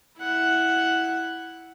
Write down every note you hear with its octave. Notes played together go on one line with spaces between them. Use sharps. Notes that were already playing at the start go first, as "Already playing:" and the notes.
E4 F#5